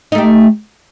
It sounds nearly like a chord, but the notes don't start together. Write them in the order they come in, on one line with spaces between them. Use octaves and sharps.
D#4 A3 G4